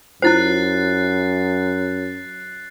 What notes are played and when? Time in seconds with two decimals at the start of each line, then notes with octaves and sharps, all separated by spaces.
0.22 F#2 E4 F4 C5 F#6 A6 C7